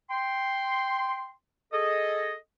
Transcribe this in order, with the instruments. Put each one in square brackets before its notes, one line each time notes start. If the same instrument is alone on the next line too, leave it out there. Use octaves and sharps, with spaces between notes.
[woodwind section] G5 C6
G#4 A4 D#5